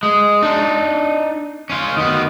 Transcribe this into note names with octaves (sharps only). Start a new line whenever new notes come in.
G#3
D4 D#4
C#4 F4
D#3 B3